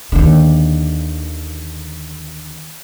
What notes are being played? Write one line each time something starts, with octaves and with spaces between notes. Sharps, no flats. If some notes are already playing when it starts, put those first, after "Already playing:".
D#2 D3